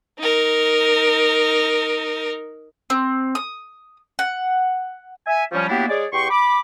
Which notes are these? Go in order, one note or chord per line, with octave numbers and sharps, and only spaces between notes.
D#4 A#4
C4
D#6
F#5
E5 G#5
F3 G3 C#4
F#3 A#3 B3 D4 E4 G4
G#3 G#4 C#5 D5
E2 G4 G5 C6 C#6
B5 D6